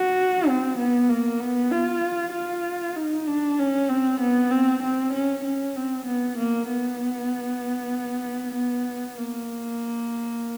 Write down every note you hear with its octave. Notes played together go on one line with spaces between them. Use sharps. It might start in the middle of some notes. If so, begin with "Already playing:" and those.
Already playing: F#4
C4
B3
A#3
B3
F4
F4
D#4
D4
C#4
C4
B3
C4
C4
C#4
C#4
C4
B3
A#3
B3
B3
A#3